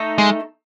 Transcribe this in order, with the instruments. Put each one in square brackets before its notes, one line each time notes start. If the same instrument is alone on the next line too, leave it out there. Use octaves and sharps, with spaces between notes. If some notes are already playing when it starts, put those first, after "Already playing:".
Already playing: [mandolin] A3 D#4 A4
[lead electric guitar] G#3